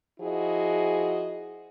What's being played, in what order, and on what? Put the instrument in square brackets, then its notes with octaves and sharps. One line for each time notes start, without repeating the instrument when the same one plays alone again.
[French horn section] F3 E4 F#4 G#4 D#5